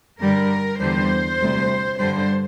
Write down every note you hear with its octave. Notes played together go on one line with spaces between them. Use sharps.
G2 D3 G3 A#4
E2 D3 G3 C5
D2 C3 G3
G2 D3 G3 C5